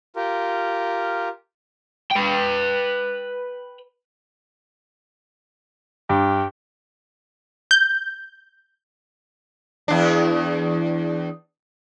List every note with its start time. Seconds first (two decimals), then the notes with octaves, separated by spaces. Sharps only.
0.16 F4 G4 A#4
2.12 B4 G5
6.10 G2 G4
7.71 G6
9.88 E2 D4